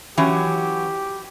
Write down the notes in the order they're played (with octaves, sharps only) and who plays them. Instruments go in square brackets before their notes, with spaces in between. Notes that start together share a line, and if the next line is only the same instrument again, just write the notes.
[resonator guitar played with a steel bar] E3 F#3 C#4 [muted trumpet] G4